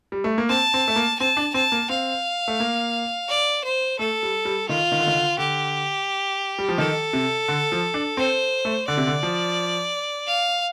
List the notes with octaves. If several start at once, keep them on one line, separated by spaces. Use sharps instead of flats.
G3
A3
A#3
C4 A5
C4
A3
A#3
C4 A5
D4
C4 A5
A#3
C4 F5
A3
A#3
D5
C5
A3 A4
G3
G3
D#3 F4
D#3
D3
D#3
D3
D3 G4
G3
F3
D#3 A4
C3
D3
F3
D4
C4 C5
A3
D3 D5
C3
D3
F3
F5